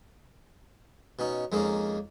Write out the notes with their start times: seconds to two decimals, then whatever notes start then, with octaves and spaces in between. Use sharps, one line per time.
1.19 B2 C#4 D#4
1.52 F2 G#3 A#3 C#4 D#4